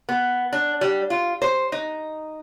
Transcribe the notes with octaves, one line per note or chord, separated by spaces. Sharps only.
B3
D4
G3
F4
C5
D#4